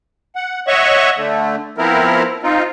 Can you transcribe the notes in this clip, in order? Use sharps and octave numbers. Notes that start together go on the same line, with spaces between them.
F#5
C#5 D#5 E5 F#5 C#6
D3 A3
F3 B3 C4 E4 A#4
C4 D#4 F4